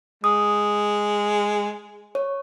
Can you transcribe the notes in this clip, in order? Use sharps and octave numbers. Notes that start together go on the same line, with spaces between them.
G#3 D#6
C#5